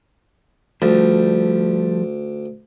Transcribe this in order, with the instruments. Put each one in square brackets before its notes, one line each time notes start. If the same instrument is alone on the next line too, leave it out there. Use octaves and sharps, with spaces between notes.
[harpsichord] D2 [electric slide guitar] F3 G3 A3